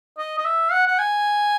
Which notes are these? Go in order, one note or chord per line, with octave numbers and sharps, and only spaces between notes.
D#5
D#5
E5
F#5
F#5
G#5